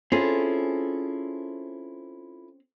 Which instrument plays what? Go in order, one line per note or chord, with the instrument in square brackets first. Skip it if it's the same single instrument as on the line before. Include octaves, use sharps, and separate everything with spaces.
[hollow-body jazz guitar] C4 C#4 G#4 [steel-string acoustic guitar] E4 F4 A4